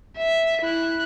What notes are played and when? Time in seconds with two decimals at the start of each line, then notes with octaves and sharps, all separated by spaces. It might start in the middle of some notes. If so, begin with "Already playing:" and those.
0.17 E5
0.62 E4 F#6